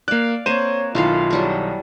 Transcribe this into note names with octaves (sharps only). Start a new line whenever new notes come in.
A#3 D5 F5 F#6
A#3 C4 A#4 C5 C#5 D#7 E7
B1 D#3 E4 F4 A4 F5
F#3 G3 A4